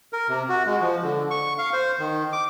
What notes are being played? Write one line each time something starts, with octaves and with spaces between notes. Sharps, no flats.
A#4
C3
F#4
G#3
F3
D3
C#6
F5
C5
D#3
D6